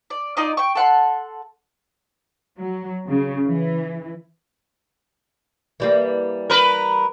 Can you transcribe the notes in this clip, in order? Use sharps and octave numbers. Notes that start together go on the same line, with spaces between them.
D5
D#4 F4 D5 D#5
G5 C#6
A4 F#5 C6
F#3
C#3
E3
E3 G3 A#3
A#4 B4